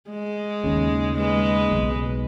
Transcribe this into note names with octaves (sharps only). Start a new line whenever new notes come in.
G#3
D#2 C#3
G#3 B4
B1